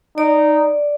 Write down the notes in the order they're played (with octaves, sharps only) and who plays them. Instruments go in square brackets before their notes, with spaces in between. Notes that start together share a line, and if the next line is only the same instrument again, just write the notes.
[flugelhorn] D#4 [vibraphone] D5